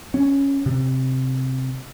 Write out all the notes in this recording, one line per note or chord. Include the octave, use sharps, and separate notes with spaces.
C#4
C3